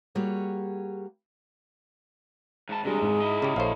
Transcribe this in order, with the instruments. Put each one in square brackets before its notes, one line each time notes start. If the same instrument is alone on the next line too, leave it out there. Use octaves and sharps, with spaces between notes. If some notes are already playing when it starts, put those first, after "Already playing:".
[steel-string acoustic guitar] G3 A#3 F#4 G#4 C#5
[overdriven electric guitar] G#2 A5
[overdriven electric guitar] C3 G#3 [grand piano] G3 D4 [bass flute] G#4
[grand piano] G#2
[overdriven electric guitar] E4 D#5
[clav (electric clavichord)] C#3 G4
[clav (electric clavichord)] A#1 C5 [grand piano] A4 C#5 F5